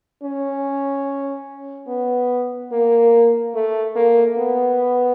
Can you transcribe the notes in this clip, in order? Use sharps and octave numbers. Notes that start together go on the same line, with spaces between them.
C#4
B3
A#3
A3
A#3
B3